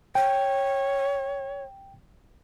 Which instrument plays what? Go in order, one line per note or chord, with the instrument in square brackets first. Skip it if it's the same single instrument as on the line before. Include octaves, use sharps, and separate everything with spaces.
[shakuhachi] C#5 [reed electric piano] G5